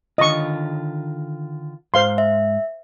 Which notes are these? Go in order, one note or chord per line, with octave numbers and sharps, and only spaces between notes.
D3 D#3 F4 D#5 C#6
G#2 G#3 C5 F5 C6
E5